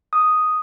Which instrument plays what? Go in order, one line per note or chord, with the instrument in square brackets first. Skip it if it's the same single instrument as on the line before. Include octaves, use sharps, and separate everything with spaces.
[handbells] D#6